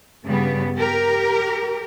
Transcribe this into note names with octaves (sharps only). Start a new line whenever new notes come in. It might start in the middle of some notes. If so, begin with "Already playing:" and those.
G2 C#3 G3 B3
G4 A#4